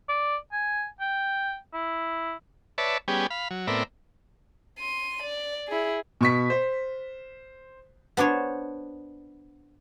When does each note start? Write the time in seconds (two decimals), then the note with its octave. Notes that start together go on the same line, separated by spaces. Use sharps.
0.09 D5
0.53 G#5
1.01 G5
1.74 E4
2.78 B4 C#5 D5 E5 A5
3.08 G3 B3 C#4 G4 G#4
3.30 F5 B5
3.51 F#3
3.67 A2 B3 C4 A#4 D5 E5
4.79 C6 D#7
5.23 D5
5.68 E4 G#4
6.21 B2 C#6 B6
6.50 C5
8.17 B3 D4 C5 C#5